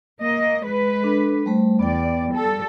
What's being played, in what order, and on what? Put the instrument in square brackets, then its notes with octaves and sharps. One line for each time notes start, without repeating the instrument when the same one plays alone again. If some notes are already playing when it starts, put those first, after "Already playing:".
[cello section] A#3 D#5
G#3 B4
[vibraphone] D4 A4
G3 A3 C5
[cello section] E2 D5 [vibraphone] B3 G5
[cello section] G3 A4